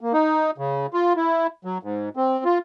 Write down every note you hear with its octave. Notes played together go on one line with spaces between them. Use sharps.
A#3
D#4
C#3
F4
E4
F#3
G#2
C4
F4